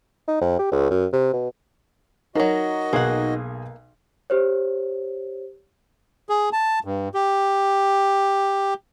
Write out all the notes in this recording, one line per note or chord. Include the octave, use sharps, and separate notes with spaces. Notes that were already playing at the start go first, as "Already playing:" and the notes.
D#4
F2
G4
C#2
F#2
C3
B2
F3 F#3 D#4 F#4 A#4 D#5
B1 A#3 G#4 F#5
G4 C5 C#5
G#4
A5
G2
G4